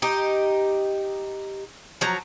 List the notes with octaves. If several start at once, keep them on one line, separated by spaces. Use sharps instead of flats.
D#4 G4
F3 F#3 A#5